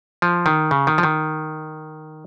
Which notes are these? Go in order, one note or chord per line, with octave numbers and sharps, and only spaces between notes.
F3
D#3
C#3
D#3
F3
D#3